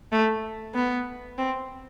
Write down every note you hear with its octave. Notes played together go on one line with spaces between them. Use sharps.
A3
B3
C4